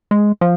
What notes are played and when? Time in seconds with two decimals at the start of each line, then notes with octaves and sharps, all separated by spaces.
0.11 G#3
0.41 F3